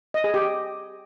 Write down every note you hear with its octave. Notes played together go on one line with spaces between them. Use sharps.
D#5
G#4
G4